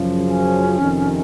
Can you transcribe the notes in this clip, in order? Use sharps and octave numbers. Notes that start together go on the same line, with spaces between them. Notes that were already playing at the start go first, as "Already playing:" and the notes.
Already playing: F#2 C#3 F3
C#4
F2 C3 D#3